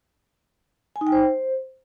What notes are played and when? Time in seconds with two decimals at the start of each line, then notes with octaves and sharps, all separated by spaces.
0.96 G#5
1.01 D#4
1.07 G5
1.12 C5